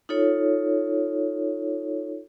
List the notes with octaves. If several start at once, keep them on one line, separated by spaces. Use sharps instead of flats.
D#4 F4 A4 C#5